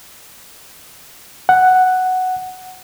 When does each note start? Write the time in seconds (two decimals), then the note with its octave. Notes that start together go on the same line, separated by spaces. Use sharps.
1.49 F#5